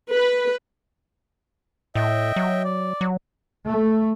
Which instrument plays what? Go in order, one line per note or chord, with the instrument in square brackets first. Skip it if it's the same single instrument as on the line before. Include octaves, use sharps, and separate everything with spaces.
[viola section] B4
[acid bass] A2 [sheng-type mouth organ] D#5 E5 G5
[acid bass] F#3
[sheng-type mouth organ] D5
[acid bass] F#3
[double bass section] A3